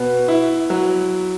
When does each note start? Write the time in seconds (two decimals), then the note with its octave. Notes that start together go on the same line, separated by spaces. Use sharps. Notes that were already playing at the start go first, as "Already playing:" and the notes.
Already playing: B2 B3
0.28 E4
0.70 F#3